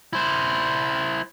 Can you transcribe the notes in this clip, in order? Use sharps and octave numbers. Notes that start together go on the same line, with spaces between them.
E4 C5